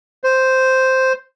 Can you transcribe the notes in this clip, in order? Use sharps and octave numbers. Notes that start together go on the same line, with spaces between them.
C5